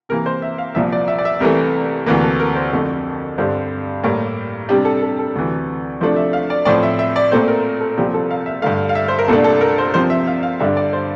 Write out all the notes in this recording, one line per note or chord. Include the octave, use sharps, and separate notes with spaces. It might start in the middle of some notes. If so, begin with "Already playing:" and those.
C3 E3 A#3 A#4
C5
E5
F5
C2 A#2 F3 E5
D5
E5
D5
E5
C2 C3 E3 A3 A#4
D2 C3 E3 A#3
A4
A#4
C5
F2 D3 A3
G2 D3 G3 C4
A2 G3 A#3
C3 G3 D4 G4
A4
A4
A4
D2 C3 E3
C3 F3 A3 D4 C5
E5
F5
D5
A2 F3 C4 D5
E5
E5
D5
A#2 A3 C4 C5
A#4
A4
C2 A#2 F3 C4 G4
A4
F5
E5
G2 D3 A3 F5
F5
E5
C5
A#4
C2 A#2 A3 D4 A4
A4
A#4
C5
C3 F3 C4 C5
E5
F5
F5
G2 D3 G3 D4 E5
D5
C5